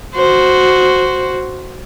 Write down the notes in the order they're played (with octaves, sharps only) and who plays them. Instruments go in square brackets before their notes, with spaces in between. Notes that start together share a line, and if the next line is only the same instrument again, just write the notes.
[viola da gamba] F#4 C5